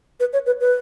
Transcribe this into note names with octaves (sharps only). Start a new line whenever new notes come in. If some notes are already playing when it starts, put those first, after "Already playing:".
B4
C#5
B4
B4